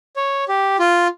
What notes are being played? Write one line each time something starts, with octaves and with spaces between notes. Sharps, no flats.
C#5
G4
F4